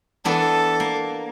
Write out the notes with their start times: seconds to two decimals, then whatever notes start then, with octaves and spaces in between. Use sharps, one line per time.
0.25 E3 B3 D4 A4
0.80 A#3